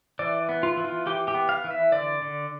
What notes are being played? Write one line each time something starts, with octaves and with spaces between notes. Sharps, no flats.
E3 D5
B3
F4
E3
F4
E3 G4
G4
B3
F5
E3
E5
D3 D5
D3